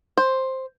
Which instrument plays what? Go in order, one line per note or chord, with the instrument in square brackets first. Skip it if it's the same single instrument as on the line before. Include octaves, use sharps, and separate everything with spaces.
[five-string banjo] C5